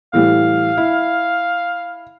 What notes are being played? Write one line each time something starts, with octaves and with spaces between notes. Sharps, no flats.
A2 E3 G3 F5
E4